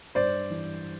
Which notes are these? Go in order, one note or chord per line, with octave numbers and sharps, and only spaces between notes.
G2 C5 D5
E3